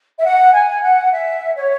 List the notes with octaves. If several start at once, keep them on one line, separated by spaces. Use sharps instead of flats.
E5
F#5
G#5
F#5
E5
C#5